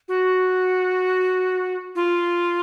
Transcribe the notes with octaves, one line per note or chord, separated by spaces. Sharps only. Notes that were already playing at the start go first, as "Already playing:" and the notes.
F#4
F4